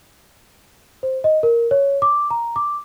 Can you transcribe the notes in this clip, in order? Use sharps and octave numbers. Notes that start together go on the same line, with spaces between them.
C5
D#5
A#4
C#5
D6
A#5
D6